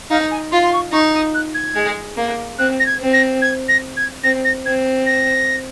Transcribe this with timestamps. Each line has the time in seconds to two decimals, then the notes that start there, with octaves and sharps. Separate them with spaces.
0.10 D#4 F5
0.31 G#5
0.52 F4 C6
0.63 C6
0.73 C#6
0.92 D#4 C#6
1.14 D#6
1.34 F#6
1.54 G#6
1.76 G#3
2.17 A#3
2.58 C4 F#6
2.80 A#6
2.86 G#6
3.00 C4
3.13 A#6
3.42 G#6
3.68 A#6
3.97 G#6
4.23 C4 A#6
4.44 A#6
4.65 C4 G#6
5.06 A#6